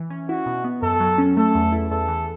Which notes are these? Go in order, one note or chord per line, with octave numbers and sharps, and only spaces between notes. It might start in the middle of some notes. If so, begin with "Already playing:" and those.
Already playing: E3
C#4
E4 F#4
B2
B3
F#2 A4
F#3
C#4
A3 A4
E2
E4
E2 A4
E3